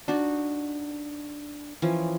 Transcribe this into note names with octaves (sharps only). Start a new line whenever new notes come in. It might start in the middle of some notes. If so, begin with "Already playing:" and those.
D4 D#4 F#4
E3 F3 C#4